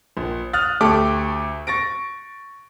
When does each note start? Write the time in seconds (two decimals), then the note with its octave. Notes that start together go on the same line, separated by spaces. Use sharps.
0.17 A#1
0.53 D#6 F6 F#6 A6
0.81 D2 A3 G4 A4 D6
1.67 C#6 A6 A#6 D7